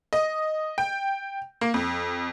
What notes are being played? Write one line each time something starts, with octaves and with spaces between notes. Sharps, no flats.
D#5
G5
A#3
F2